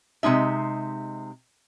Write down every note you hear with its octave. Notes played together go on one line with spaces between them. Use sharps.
C3 G#3 D#4 E5